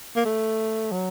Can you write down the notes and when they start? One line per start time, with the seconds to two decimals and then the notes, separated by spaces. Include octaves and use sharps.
0.16 A#3
0.25 A3
0.92 F#3